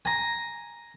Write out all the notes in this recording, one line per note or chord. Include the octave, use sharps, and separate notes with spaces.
G#5 A#5